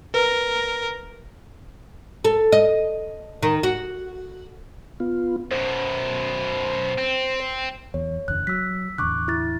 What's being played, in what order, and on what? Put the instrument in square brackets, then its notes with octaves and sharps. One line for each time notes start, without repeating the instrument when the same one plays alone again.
[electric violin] A#4 [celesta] B4
[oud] A4
D#5
D#3
F#4
[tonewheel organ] B3 F4
[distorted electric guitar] F#2 B2 [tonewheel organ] C5
[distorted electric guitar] C4
[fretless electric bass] E2 [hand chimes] C#5
[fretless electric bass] F#1 E2 D3 [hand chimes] F#6
[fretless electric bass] F#3 [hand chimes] E6 B6
[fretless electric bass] E2 A2 D3 [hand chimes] C#6 D6 F#6
[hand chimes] E4 A6